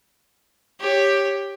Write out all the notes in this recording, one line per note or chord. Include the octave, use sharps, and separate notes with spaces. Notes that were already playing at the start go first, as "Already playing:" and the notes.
G4 C#5